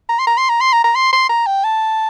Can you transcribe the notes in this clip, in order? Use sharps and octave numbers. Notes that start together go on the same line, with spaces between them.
A#5
C6
A#5
C6
A#5
C6
A#5
A#5
C6
C6
A#5
G5
A5